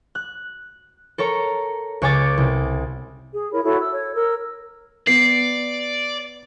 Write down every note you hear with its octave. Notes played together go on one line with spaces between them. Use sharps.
F#6
A4 A#4 C#5 A#5
C#2 C#5 G#5 D6 A6
C2
G#4
E4 A#4 C#5 B5
E4 F#4 A4 C#5
E6
C#5
A#4 E6
B3 D5 C7